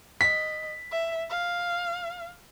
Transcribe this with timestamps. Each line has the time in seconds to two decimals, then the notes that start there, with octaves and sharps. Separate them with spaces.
0.21 D#5 B6
0.91 E5
1.30 F5